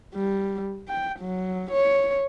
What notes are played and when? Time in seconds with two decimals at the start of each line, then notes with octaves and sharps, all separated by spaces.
0.15 G3
0.88 G5
1.20 F#3
1.72 C#5